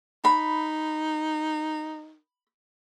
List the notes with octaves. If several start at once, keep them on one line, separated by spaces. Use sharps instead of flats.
D#4 B5